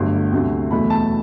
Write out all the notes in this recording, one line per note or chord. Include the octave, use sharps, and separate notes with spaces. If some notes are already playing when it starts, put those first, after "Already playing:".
Already playing: G1 G2 F#3 A3 C6
D2 C3 F#3 A3
E2 B2 F#3 A3 B5
A5